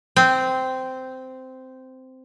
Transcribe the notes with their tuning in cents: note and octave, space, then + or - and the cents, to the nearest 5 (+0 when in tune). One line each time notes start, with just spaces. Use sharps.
C4 -10